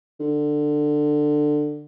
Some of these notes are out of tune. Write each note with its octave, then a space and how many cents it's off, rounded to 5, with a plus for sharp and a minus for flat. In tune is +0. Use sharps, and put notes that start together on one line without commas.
D3 +15